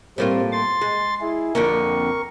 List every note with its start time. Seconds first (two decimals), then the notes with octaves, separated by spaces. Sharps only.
0.18 A2 G3 A#3 C4 F4
0.52 C6 A6
0.81 G#3
1.21 E4 G#4
1.55 F2 D3 A#3 A#4 C#6